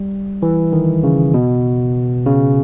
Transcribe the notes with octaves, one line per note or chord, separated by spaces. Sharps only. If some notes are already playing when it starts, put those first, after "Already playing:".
Already playing: G3
E3
D#3
C#3
B2
C#3